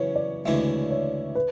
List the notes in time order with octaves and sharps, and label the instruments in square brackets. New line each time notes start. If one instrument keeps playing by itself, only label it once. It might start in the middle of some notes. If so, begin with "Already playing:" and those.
Already playing: [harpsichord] F#2 C#3 E3 B3 [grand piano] C#5
[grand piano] D5
[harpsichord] D2 C#3 E3 G#3 [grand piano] E5
[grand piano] C#5
B4